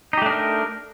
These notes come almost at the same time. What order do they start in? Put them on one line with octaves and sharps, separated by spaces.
D#4 G4 A3 D4 A#4